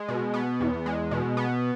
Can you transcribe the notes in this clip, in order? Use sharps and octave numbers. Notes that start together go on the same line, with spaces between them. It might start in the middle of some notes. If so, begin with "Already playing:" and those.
Already playing: G#3
B2
B3
E2
G#3
B2
B3